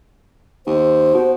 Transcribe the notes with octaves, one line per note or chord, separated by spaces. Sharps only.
D#2 C5
B2